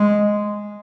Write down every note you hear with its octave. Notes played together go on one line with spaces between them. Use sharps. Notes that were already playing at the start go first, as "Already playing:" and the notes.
Already playing: G#3